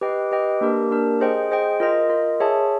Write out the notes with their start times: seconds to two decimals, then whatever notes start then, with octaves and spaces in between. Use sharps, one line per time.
0.01 G4 B4 D#5 G5
0.32 G4 B4 D#5 G5
0.61 A#3 D4 G4 A#4
0.90 A#3 D4 G4 A#4
1.20 G#4 C5 D#5 G5
1.51 G#4 C5 D#5 G5
1.80 F4 A#4 D#5
2.10 F4 A#4 D#5
2.40 G#4 C#5 E5 A5